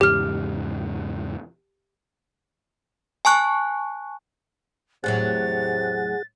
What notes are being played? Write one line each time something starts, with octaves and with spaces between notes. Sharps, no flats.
E2 G#2 C#3 G4 F6
G#5 A5 C#6 F#6
E2 A2 C3 F#3 G#4 F#5 A6